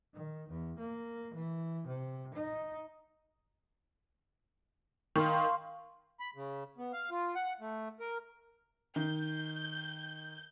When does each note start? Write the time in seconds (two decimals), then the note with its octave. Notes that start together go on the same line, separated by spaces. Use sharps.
0.13 D#3
0.48 E2
0.78 A#3
1.34 E3
1.87 C3
2.34 D#4
5.16 D#3 F5 C6 C#6
6.20 B5
6.36 C#3
6.78 B3
6.93 F5
7.11 F4
7.35 F#5
7.61 A3
8.00 A#4
8.96 D#3 G6